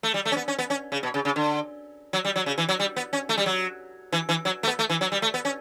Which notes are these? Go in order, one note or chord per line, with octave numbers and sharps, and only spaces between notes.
A3
G3
A3
C#4
B3
C#4
B3
C#4
C#3
B2
C#3
C#3
D3
F#3
G3
F#3
C#3
E3
F#3
G3
B3
C#4
A3
G3
F#3
E3
E3
F#3
A3
B3
A3
E3
F#3
G3
A3
B3
C#4